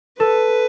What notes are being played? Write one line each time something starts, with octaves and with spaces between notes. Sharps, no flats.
A4 B4